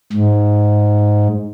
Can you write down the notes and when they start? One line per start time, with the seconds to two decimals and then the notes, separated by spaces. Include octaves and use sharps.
0.12 G#2